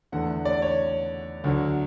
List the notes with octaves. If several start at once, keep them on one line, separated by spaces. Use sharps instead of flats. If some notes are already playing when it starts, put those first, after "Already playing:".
E2 D3 A3 F#5
D5
C#5
D2 D3 F#3